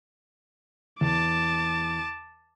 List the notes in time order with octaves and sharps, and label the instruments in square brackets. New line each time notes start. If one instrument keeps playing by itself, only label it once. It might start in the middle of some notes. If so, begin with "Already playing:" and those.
[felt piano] E2 [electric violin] A5 D6